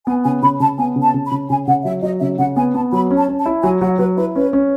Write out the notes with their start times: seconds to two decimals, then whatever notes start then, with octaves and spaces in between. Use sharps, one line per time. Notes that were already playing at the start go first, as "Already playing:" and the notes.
0.07 B3 G#5
0.24 C#3 G#5
0.42 C#3 B5
0.60 C#3 A5
0.78 B3 G#5
0.96 C#3
1.02 A5
1.14 C#3
1.26 B5
1.32 C#3
1.50 C#3 G#5
1.67 C#3 F#5
1.85 F#3 E5
2.03 F#3 D#5
2.21 C#3 E5
2.39 C#3 F#5
2.56 B3 G#5
2.74 B3 A5
2.92 F#3 B5
3.11 C#4
3.17 A5
3.28 C#4
3.39 A5
3.46 E4
3.63 F#3 G#5
3.81 F#3 F#5
3.99 F#3 B4
4.17 E4 B4
4.35 C#4 B4
4.53 C#4